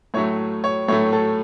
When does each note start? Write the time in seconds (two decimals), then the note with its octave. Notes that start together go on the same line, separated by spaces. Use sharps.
0.14 A2 F#3 A3 C#5
0.64 C#5
0.88 A2 F#3 A3 C#5
1.13 A4